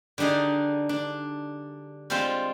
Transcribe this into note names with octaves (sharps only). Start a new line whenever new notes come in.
D3 G3 D4 D#4 G#4
D4
G3 G#3 C4 F4 C5